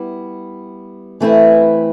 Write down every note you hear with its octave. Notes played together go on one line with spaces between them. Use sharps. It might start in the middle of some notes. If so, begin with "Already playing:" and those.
Already playing: G3 B3 E4
E3 A3 C4 E4 B4